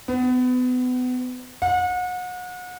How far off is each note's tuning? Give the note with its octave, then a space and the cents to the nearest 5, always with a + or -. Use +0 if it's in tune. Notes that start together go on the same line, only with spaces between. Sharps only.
B3 +30
F#5 -35